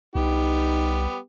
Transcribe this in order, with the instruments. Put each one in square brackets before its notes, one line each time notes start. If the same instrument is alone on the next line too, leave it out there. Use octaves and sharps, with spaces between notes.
[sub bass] C2 [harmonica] G3 B3 G4 [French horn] D#4